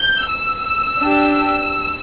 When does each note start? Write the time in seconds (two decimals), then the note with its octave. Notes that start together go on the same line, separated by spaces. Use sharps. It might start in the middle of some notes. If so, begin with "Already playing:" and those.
Already playing: G6
0.28 E6
0.99 D4 G4